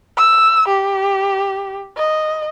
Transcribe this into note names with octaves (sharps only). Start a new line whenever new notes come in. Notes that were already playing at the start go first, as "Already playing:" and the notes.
E6
G4
D#5